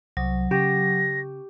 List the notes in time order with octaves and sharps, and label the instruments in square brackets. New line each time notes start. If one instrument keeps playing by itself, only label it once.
[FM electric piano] C2 [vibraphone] F#3
[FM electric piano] C#3 [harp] G4 [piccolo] A#6